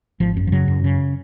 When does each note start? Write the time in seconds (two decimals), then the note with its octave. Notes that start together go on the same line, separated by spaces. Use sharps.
0.20 G#1 F3
0.37 F#2
0.47 F3
0.52 C#3 F#3
0.68 F#2
0.84 C#3